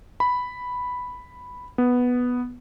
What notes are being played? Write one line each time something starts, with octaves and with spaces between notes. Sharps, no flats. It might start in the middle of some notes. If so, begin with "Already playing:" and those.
B5
B3